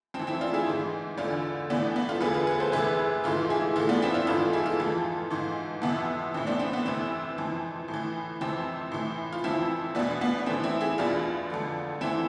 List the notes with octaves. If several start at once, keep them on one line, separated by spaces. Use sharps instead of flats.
F2 C4
E3
C4 E4
D4 F4
E4 G#4
G#2 E3
E2 D3 D4 F4
A2 E3 B3 D4
B3
F4 A4
E2 D3 G#4 B4
F4 A4
G#4 B4
A4 C5
E2 C3 E3 G#4 B4
G#2 E3 F4 A4
E4 G#4
A2 E3 F4 A4
B3 D4
C4 E4
D4 F4
G#2 E3 F4 A4
E4 G#4
F4 A4
F2 E3
G#2 E3
F2 C3 E3 B3
A2 E3 C4
B3 D4
C4
B3
E2 C3 E3 C4
F2 E3
A2
E3
F2 C3 E3 C4
A2 E3
F4
F2 E3 C4 E4
E2 B2 B3 D4
B3
D4
A2 E3 C4
C4 E4
E4 G#4
E2 B2 D4 F4
F2 D3
F2 E3 C4 E4